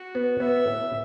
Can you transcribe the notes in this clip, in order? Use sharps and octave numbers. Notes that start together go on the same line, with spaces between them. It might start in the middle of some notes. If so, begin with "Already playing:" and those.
Already playing: F#4
B3
B3 E5
A2